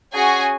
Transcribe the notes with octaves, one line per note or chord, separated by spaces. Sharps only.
C#4 F#4 G#4 G#5